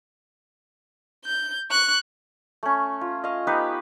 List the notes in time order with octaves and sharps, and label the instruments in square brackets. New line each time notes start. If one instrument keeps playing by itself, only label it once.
[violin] G6
C#6 F#6
[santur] A3 C#4
F4
D#5 F5
B3 D#4 G4 B4